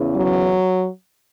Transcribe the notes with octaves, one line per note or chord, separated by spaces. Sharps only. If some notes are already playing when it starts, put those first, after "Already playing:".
Already playing: E2 C#3 E3
F#3